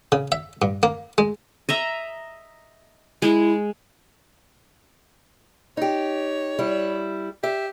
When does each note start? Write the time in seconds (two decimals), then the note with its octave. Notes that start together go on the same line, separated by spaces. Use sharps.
0.12 C#3
0.32 E5
0.62 G2
0.83 A#3
1.18 G#3
1.69 D#5 E5 A#5
3.22 G#3 E4
5.77 D#4 G4 C#5
6.59 G3 E4
7.43 G4 E5